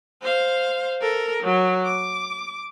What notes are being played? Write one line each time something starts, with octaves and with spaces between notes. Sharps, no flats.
C5 F5
A4 A#4
F#3
D6